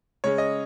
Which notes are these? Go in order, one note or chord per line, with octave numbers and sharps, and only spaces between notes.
C#3 G#3 C#4 C#5
D#5